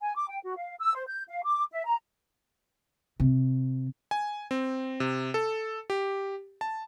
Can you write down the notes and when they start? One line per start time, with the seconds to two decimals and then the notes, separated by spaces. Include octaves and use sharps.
0.01 G#5
0.16 D6
0.29 G5
0.43 F#4
0.57 F5
0.79 E6
0.95 C5
1.07 G6
1.28 F5
1.44 D6
1.72 E5
1.86 A#5
3.20 C3
4.11 G#5
4.51 C4
5.00 C3
5.34 A4
5.90 G4
6.61 A5